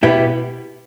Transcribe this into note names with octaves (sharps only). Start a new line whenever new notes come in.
B2 B3 E4 G4